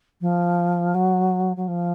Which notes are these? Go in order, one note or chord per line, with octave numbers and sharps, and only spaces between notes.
F3
F#3
F#3
F3